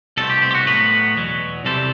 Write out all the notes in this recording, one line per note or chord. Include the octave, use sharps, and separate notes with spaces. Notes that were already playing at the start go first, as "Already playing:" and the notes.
C2 B2 A3 C4 A4
G4
C4
G4
F#4
A2 F#3 B3 B4
E2 B2 F#3
C2 C3 E3 G3 C4 A4